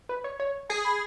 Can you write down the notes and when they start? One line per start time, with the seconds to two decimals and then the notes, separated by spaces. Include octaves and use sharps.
0.09 B4
0.24 C#5
0.40 C#5
0.70 G#4 G#5
0.85 B5